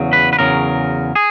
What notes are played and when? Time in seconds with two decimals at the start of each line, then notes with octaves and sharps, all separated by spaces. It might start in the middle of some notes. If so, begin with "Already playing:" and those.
Already playing: E2 C#3 F#3
0.13 B4
0.33 B4
0.39 E2 C#3 F#3 A#4
1.16 G#4